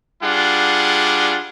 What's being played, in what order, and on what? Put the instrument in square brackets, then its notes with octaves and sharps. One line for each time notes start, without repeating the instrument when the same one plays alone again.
[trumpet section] G3 D4 F4 G#4 F#5